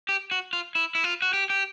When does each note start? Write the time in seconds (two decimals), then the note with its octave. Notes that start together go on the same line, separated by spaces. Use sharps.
0.09 G4
0.31 F#4
0.53 F4
0.75 E4
0.95 E4
1.04 F4
1.22 F#4
1.33 G4
1.50 G4